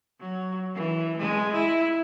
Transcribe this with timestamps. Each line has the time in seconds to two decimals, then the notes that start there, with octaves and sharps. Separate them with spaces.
0.20 F#3
0.75 E3
1.18 G#3
1.53 E4